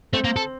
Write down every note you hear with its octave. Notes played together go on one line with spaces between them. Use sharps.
A3 C4
A#3
A4